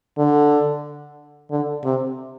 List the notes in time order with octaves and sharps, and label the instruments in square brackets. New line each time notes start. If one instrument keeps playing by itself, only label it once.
[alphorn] D3
D3
C3